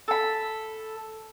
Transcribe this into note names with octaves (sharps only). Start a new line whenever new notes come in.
A4 B5